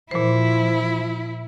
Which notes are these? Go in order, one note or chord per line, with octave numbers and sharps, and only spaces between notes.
A#2 F3 E4 C5